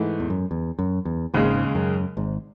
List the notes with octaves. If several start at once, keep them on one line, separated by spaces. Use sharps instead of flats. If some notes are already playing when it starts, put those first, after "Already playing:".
Already playing: G#2 E3 A3
E2
F#2
E2
F#2
E2
G#1 D#2 G#2 C#3 G#3
F#2
G#1 G#2